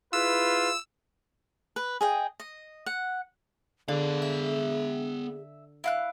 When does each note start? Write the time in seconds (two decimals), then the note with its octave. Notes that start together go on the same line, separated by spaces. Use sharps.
0.13 E4 F4 G#4 B4 E6
1.76 B4
2.01 G#4 D#5 G5
2.40 D#5
2.86 F#5
3.88 D3 B3 G#4 F5
4.22 E5
5.84 E4 F5 F#6